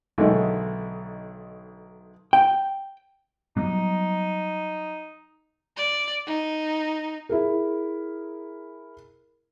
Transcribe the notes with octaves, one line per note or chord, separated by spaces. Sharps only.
B1 D3 D#3 G#3 A3
G5
F#3 G3 B3 D#4
D5
D#4
E4 G#4 A#4